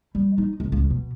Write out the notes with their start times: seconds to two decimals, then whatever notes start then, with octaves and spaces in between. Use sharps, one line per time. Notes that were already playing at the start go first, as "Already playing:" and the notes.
0.15 G3
0.38 D#4
0.60 C#2
0.72 C#2
0.90 B2